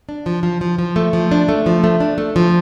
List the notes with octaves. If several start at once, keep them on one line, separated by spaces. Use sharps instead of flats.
D4
F3
F3
F3
F3
A3
F3
D4
A3
F3
A3
D4
A3
F3